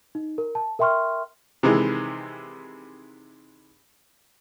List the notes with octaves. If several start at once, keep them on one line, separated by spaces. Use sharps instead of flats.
D#4
A#4
A5
A#4 E5 G5 C6 C#6 F6
C3 D#3 E3 G#3